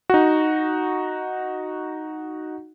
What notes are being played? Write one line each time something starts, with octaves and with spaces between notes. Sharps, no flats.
D#4 F#4